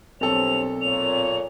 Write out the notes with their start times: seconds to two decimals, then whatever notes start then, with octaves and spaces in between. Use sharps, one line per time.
0.21 B1 G2 C4 A4 A#4 C5 C#5 F7
0.82 A#2 C#5 F7